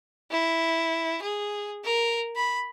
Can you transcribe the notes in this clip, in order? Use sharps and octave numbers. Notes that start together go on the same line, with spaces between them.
E4
G#4
A#4
B5